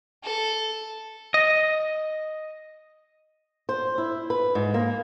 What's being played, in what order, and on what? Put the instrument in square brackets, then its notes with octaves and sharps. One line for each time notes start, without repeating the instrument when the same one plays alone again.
[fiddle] A4
[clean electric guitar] D#5
[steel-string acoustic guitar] C5
E4
B4
G#2
A#3